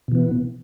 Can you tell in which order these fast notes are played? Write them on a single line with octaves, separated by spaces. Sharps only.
B2 E3 B3